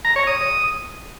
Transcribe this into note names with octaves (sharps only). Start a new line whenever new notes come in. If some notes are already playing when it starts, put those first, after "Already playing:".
A#5
C#5
D#6